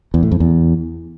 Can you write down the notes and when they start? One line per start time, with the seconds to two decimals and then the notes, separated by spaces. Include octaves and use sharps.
0.14 E2
0.23 A2
0.32 F2
0.40 E2